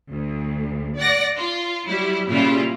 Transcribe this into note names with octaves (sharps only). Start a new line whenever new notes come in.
D2
D5 F#5 A#6
F4
F#3 G3 E4
A#2 C#3 G3 E4 F4